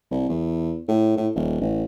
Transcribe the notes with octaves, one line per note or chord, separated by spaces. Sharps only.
C2
E2
A2
A2
D#1
A1